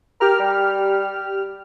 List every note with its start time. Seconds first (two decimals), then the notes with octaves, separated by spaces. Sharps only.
0.21 G4 A#4 F6
0.39 G3